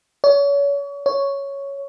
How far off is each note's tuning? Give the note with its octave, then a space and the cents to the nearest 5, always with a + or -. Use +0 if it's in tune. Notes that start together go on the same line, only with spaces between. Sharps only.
C#5 +35
C#5 +5